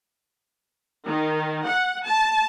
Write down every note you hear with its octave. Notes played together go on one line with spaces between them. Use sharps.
D#3
F#5
A5